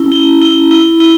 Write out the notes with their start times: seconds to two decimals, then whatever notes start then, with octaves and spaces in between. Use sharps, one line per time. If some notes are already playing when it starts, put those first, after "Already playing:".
Already playing: C#4 E4
0.12 E4
0.41 E4
0.71 E4
1.00 E4